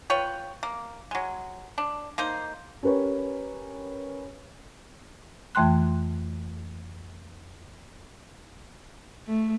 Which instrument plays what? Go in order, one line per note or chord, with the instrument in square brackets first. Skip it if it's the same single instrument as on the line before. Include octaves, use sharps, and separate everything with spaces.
[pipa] F4 B4 C#5 G5
A#3
F#3 G#3
D4
A#3 D#4 C5
[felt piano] C#4 G4 A#4 B4 C#5
[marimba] F2 E3 A3 G5 C6 F#6
[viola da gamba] A3